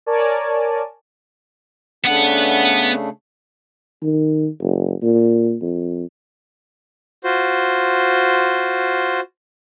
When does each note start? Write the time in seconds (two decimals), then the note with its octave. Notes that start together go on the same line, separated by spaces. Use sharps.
0.06 A#4 C#5 D5 G#5 A5
2.05 C#3 A3 B3 D4 F#5
4.03 D#3
4.61 F#1
5.02 A#2
5.62 F2
7.24 F4 F#4 C5